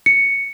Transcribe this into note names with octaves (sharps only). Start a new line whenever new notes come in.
C#7